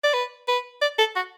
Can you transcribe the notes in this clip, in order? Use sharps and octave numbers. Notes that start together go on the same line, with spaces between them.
D5
B4
B4
D5
A4
F#4